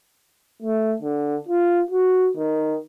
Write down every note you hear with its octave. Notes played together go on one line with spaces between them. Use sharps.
A3
D3
F4
F#4
D#3